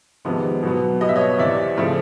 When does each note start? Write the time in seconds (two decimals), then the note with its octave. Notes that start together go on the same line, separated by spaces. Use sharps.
0.25 F2 C3 D#3 G#3 B3
0.63 B2 F#3 B3
1.01 B2 G3 B3 D#5
1.09 E5
1.16 C#5 D#5
1.39 E2 C3 E3 D5 E5
1.77 C#3 F3 A3 C4